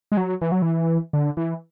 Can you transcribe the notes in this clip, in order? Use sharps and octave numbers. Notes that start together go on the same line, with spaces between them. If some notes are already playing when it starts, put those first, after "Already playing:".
G#3
F#3
E3
F#3
E3
D3
E3